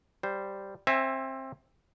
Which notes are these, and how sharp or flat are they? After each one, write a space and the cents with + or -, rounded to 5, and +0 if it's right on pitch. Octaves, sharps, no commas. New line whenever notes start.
G3 +0 C5 +0
C4 +20 E5 +0 G#5 +0